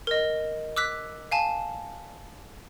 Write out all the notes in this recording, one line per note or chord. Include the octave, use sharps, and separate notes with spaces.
A#4 D#5
D6 E6 F#6 B6
F5 G#5 A5